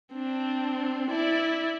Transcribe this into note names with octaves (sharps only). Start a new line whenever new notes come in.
C4 D4
E4 D5